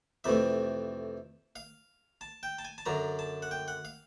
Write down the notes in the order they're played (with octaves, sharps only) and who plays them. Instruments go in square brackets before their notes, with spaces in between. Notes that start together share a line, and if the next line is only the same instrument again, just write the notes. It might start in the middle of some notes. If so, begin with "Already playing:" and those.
[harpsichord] F2 C3 E3 A3 E5
F5
A5
G5
A5
G#5
A5
F#2 D3 F#3 A#5
A5
F#5
G5
F#5
F5